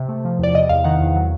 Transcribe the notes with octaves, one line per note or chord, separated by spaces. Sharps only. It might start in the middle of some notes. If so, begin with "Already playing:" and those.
Already playing: C3
A3
F3
E2 D5
C3 D#5
E2 F5
D#3 F#5
E2
F#3